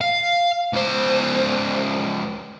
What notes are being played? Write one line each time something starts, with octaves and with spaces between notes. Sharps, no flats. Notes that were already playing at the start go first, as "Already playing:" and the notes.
F5
C#2 C5